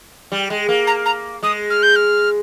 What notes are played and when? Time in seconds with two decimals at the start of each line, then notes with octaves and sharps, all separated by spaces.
0.32 G3
0.50 G#3
0.69 A#3
0.87 A#5
1.05 A#5
1.43 G#3 D#6
1.70 F6
1.82 G6
1.96 F6